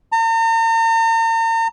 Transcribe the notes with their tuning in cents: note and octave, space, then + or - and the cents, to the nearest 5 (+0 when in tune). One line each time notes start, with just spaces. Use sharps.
A#5 -45